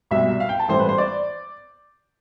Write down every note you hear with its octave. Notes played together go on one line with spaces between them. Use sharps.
C2 B2 G3 E5
F5
G5
A5
A1 A2 G3 C5
B4
C5
D5